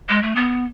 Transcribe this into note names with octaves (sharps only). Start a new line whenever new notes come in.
G#3
A3
B3